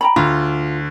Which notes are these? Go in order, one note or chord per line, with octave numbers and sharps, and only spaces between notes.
G5 A#5 B5
D2 F4